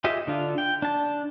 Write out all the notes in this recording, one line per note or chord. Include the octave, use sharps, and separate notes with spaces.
F4 G4 G#4 D#5 E5
D3 D4 F4
G5
D4 A5